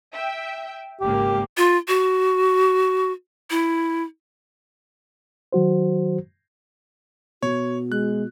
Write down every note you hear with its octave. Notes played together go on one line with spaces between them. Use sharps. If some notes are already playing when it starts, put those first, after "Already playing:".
E5 G5
G#1 C#2 A#3 G4
F4
F#4
E4
D#3 F#3 F#4 C5
B2 F#4 C#5
G#3 F#6